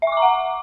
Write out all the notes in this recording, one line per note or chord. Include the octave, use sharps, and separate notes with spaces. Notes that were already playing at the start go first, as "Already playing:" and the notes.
E5 F#5 A#5 C#6 D6